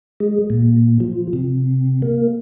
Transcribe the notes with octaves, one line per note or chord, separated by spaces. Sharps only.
G#3
A#2
F3
C3
A#3